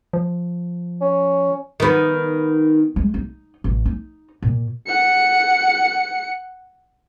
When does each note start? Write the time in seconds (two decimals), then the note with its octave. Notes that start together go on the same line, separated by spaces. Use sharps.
0.13 F3
1.01 C#4
1.80 D#3 B3
2.96 G#3
3.14 D#4
3.64 A1
3.85 D#4
4.42 A#2
4.87 F#5 C#7